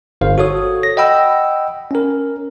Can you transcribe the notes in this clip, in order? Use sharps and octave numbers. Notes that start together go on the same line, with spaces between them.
G1 C5 F5
F#4 A4 C#5 D#6
A#6
D#5 F#5 G5 B5 E6
C#4 A#4